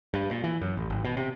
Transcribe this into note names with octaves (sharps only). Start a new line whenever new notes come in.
G2
A#2
E3
F#2
A1
G#1
B2
C3